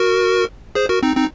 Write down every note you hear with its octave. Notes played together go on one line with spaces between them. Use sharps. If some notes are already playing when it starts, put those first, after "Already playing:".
Already playing: F#4 A#4
G#4 C5
F#4 A#4
C4 D#4
C4 D#4